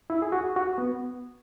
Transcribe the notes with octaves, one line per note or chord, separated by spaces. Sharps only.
E4
G#4
F#4
F#4
B3